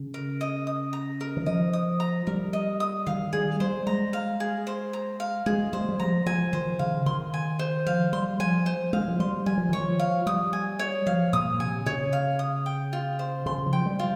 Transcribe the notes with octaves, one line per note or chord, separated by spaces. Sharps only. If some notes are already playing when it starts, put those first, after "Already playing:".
Already playing: C#3
A#4
D#5
D#6
A#5
A#4
D#3
F3 D#5
D#6
A#5
G3 A#4
D#5
D#6
D#3 F5
G3 G#4
G3 C5
G#3 A#5
F5
G#4
C5
A#5
F5
G#3 G#4
G3 C5
G#3
G3
F3 A#5
F3 G#5
D#3 C5
C#3 F5
D#3 C6
G#5
C5
F3 F5
G3 C6
F3 G#5
C5
G#3 F5
F3
G3 C6
G3 G#5
F3
D#3 C#5
F3
F5
G3 D#6
G#5
C#5
F3 F5
A#2 D#6
C3 G#5
C#3 C#5
F5
D#6
G5
F4
C5
C#3 C6
F3
G5
G3
F4